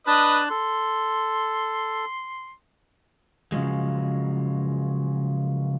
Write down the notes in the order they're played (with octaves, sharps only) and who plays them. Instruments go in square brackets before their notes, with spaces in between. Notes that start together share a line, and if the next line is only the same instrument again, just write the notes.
[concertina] D4 A5 F#6 [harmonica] B4 D#5
[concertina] A4 [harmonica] C6
[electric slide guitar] C#3 F3 F#3 G#3